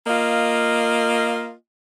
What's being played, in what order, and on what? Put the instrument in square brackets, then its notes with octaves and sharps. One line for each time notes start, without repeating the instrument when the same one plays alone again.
[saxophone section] A#3 F4 D#5